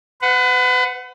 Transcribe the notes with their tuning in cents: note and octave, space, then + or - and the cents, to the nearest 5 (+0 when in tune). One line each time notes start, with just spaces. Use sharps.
B4 +35 F#5 -10